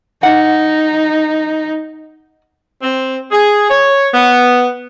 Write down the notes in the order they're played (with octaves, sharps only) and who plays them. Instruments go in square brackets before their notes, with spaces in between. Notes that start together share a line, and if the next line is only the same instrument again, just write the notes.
[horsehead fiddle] D#4 [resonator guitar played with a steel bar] F#5
[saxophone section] C4
G#4
C#5
B3